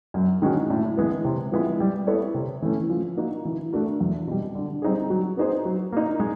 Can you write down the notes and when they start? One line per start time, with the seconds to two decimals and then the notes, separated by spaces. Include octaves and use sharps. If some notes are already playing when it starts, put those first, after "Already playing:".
0.14 F#2
0.42 D#3 G#3 C#4 F#4
0.70 A2
0.97 E3 G#3 B3
1.25 C3
1.52 F3 G#3 B3 E4
1.80 G3
2.07 B3 E4 A4 C#5
2.34 C3
2.62 E3 A3 C#4
2.90 F3
3.17 A#3 D#4 F#4
3.45 E3
3.73 A3 D4 F#4 A#4
4.00 E2
4.27 B2 G3
4.55 D3
4.82 G3 C4 D#4 G#4
5.10 F#3
5.37 B3 D#4 G#4 C5
5.65 F#3
5.92 A#3 D#4
6.20 G#3